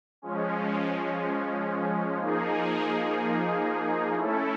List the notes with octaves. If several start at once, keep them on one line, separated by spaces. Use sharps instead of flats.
F3 G#3 C#4
F3 A#3 D#4 G#4
A3 C#4 E4 A4